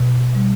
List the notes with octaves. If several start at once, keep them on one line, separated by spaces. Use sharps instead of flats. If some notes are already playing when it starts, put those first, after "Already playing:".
Already playing: B2
G3